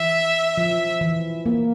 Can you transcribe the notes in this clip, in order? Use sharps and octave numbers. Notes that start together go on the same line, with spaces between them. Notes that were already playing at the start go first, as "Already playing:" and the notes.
Already playing: E3 E5
F3
E3
A#3